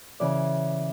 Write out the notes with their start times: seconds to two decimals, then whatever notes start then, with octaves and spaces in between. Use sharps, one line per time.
0.20 C#3 E3 D5